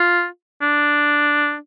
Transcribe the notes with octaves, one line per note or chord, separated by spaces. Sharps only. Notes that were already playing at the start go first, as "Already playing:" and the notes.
Already playing: F4
D4